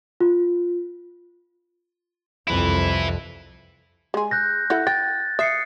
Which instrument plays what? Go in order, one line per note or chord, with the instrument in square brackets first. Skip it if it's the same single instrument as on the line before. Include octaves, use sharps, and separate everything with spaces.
[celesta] F4
[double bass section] C2 F2 [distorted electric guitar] E4 B4
[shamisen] G#3 G#4
[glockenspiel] F#6 G6 A#6
[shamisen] E4 A4 F#5
[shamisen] G5 [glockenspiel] A6
[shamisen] E5 [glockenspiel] D#6 C7 C#7